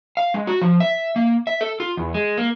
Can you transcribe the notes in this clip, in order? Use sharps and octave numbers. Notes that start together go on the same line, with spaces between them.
F5
G#3
F#4
F3
E5
A#3
E5
A4
F4
E2
G#3
A#3